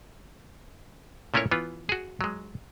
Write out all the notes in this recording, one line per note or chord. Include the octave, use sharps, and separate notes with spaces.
A#2 A3 C#4 E4 A#4 C#5
E3 B3 F4
F#4 G#4
F#3 G#3